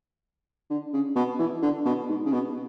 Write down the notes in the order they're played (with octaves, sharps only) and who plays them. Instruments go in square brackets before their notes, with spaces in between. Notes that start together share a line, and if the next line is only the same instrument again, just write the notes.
[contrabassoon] D3
C#3
B2
E3
D3
B2
G#2
C#3
B2